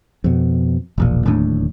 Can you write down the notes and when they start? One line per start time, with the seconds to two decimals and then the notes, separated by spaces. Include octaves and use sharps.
0.24 F2 B2
0.98 E1 A#1 A#2
1.26 D1 D#2 A2 D4